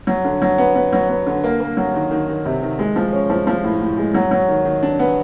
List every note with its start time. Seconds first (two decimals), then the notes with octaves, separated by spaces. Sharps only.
0.07 F#3
0.25 D3
0.42 F#3
0.58 B3
0.75 B3
0.93 F#3
1.09 B3
1.27 D3
1.44 A#3
1.60 A#3
1.77 F#3
1.94 D#3
2.11 D#3
2.28 D#3
2.45 C3
2.62 D#3
2.79 G#3
2.96 F3
3.13 C#4
3.30 F3
3.47 F3
3.64 A2
3.81 A2
3.98 G#3
4.14 F#3
4.31 F#3
4.48 D#3
4.65 D#3
4.83 D4
4.99 B3